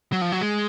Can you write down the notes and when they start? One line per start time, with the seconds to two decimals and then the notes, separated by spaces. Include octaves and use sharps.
0.12 F#3
0.21 F3
0.32 F#3
0.41 G#3